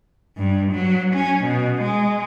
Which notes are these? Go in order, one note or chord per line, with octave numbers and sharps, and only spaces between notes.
G2
F#3
C#4
B2
G#3